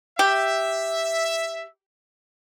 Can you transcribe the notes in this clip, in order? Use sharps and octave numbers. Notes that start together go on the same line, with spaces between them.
G4 E5